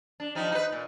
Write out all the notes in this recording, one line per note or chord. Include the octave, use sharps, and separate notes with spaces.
D4
F3 G3 D#4
D#4 B4
A#2